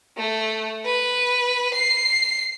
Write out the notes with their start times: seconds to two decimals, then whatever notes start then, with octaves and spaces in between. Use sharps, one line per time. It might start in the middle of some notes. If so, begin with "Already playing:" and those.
0.17 A3
0.86 B4
1.73 C7